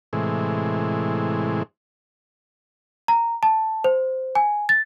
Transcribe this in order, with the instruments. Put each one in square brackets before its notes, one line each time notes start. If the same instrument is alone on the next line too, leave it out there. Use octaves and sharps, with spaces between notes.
[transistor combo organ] A2 C3 E3 G#3
[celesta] A#5
A5
C5
G#5
A6